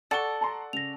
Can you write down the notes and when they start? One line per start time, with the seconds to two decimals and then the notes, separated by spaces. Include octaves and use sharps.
0.11 A4 D5 F#5 C#6 A6 G7
0.41 A5 A#5 C6
0.73 C#3 A#6 F7